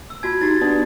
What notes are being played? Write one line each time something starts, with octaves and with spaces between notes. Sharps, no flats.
E6
F4 F#4 A5 G#6
D#4 E4 F#4 G4 A6
B3 D4 D#4 D5 D#6